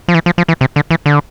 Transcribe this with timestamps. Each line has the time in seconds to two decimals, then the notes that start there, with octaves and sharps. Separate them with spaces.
0.08 F3
0.15 E3
0.26 F3
0.38 F3
0.48 E3
0.61 C3
0.76 D3
0.91 E3
1.06 D3